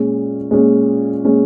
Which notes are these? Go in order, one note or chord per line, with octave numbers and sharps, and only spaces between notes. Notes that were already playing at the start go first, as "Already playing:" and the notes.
Already playing: A#2 G#3 C#4
A#2 G#3 C#4
A#2 G#3 C#4